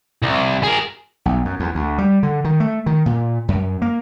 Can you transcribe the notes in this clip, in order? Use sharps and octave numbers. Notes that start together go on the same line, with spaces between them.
C2
G#4 A#4
B1
F#2
E2
D2
G3
D3
D#3
A3
D#3
A#2
F#2
A#3